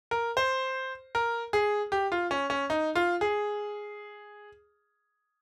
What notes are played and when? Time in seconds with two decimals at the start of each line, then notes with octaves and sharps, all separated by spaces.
0.11 A#4
0.37 C5
1.15 A#4
1.53 G#4
1.92 G4
2.12 F4
2.31 C#4
2.50 C#4
2.70 D#4
2.95 F4
3.21 G#4